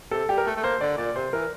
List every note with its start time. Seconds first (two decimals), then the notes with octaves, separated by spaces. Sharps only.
0.11 C3 A4
0.29 G3 G4
0.38 A#4
0.46 A3 A4
0.56 A3
0.63 A#3 C5
0.81 D3 D5
0.98 A#2 D5
1.16 C3 C5
1.33 E3 A#4